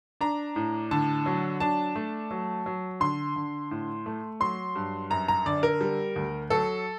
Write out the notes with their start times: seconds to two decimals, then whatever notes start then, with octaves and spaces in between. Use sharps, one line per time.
0.21 D4 A#5
0.56 A2
0.91 D3 A5
1.26 F#3
1.60 D4 A5
1.96 A3
2.31 F#3
2.66 F#3
3.00 D3 C6
3.36 D3
3.71 A2
4.06 A3
4.40 F#3 C6
4.76 G2
5.10 F#2 A#5
5.28 A#5
5.46 D3 D5
5.63 A#4
5.81 G3
6.16 D2
6.50 F#3 A4